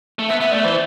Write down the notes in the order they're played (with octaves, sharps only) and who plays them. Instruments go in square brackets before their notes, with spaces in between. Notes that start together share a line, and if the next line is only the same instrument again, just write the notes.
[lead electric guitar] A3
[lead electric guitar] B3 [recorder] E5
[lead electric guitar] B3 [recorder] E5
[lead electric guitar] A3 [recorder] D5
[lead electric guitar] E3 [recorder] C5